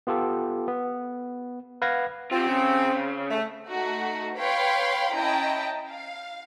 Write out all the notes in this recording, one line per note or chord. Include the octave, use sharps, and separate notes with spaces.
B3 F4 G4 A4
B3
B4 F5 F#5 G#6 A#6
C4 F4 G4
C#3
A3
A3 D#4 F#4
B4 C#5 F5 G5 B5 C6
C#4 E4 D#5 G5 A5 A#5
F5